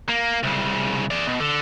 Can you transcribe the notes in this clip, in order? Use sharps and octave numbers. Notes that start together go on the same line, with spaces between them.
A#3
C2 C#3
G#4 D5
B2
D3